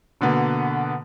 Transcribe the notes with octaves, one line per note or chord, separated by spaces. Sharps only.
B2 D3 A#3 B3